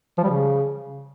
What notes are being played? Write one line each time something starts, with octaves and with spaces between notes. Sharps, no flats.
F3
G3
C#3